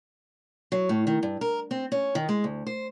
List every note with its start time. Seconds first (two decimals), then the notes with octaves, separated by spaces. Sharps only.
0.72 F#3
0.89 A2
1.07 D#3
1.23 G2
1.41 A#4
1.71 C4
1.92 C#4
2.15 D#3
2.29 G#3
2.44 D2
2.67 C5